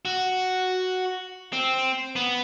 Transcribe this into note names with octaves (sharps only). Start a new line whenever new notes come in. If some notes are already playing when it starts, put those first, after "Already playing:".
F#4
C4
B3